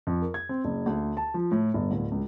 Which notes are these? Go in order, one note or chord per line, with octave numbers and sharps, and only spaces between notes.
F2
A#4
G#6
C4
F#1
D2
A5
F3
A2
G1
D1
C#2